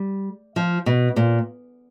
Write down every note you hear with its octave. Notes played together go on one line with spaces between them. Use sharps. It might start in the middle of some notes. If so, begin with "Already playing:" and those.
Already playing: G3
F3
B2
A#2